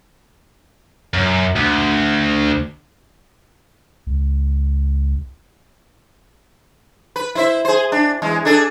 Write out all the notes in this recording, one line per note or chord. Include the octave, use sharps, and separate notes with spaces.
F#2
D2
C#2
B4
E4 C5 E5
G#4 C5
D4
E2 G#3
D4 G#4 A4